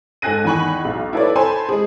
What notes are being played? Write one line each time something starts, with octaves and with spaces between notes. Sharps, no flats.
G#2 A4 G#5 F#6 A#6 D#7
E2 D#3 G#5 B5 C#6 F#7
B1
E4 A4 B4 C#5 D5
A4 C5 G#5 A5 B5 C6
G#3 G#4